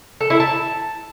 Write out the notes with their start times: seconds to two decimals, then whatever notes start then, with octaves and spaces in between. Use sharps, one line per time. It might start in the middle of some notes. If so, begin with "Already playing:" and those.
0.20 A4
0.30 E4
0.40 A5